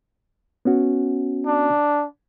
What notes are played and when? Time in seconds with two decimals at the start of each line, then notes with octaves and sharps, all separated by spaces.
0.65 B3 C#4 F#4
1.46 D4